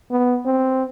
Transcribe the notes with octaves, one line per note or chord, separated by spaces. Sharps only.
B3
C4